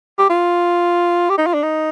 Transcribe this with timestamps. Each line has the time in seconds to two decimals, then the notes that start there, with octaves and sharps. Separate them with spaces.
0.18 G4
0.30 F4
1.30 G4
1.38 D#4
1.46 F4
1.54 D4
1.63 D#4